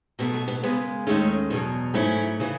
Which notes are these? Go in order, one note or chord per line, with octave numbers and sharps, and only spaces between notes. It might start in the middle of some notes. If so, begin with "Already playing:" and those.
B2 F#3 A3 B3
A3
B3
F#2 C#3 G#3 B3
D#2 D#3 G#3 A3 C#4
E2 B2 F#3
G#2 F#3 A3 C#4 E4
C#3 E3